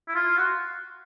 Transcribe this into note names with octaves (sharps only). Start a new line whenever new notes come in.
E4
F4
F#4